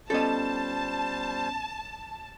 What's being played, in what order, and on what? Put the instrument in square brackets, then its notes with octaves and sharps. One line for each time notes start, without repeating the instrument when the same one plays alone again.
[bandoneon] G3 C5 [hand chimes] B3 C#4 F4 [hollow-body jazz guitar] A4 D#5 [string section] A5